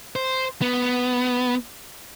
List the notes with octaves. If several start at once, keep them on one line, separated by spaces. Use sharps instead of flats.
C5
B3